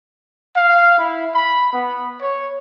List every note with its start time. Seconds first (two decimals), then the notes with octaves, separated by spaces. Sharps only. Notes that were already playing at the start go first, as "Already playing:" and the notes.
0.54 F5
0.96 E4
1.33 B5
1.72 B3
2.19 C#5